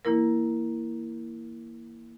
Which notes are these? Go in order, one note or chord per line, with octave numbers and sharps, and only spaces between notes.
E3 A#3 E4 A#4